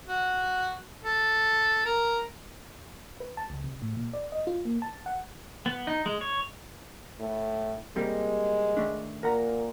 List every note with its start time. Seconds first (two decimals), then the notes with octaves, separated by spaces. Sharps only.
0.08 F#4
1.03 A4
1.85 A#4
3.20 B4
3.37 A5
3.50 C#2
3.64 C3
3.82 A2
3.97 A#2
4.13 D5
4.32 D#5
4.47 F4
4.65 A#3
4.82 A5
5.06 F#5
5.66 B3
5.87 D#4
6.06 G#3
6.21 C#5
7.20 A2
7.96 C3 G3 G#3 A#3
8.77 D#3 A3 D4
9.23 A#2 A#4 F#5 A#5